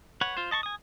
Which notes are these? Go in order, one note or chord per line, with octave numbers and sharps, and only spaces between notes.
B4 C#5 F#5
F4 C5
D#5 A5 C6 C#6
G#5 D#6